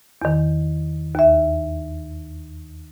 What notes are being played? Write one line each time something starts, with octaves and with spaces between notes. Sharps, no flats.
E2 D#3
D#2 E5